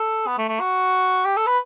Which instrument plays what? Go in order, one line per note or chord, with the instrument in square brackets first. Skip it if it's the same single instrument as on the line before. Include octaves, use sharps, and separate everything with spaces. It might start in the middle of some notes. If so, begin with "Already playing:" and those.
Already playing: [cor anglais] A4
B3
A3
A3
F#4
G4
A4
B4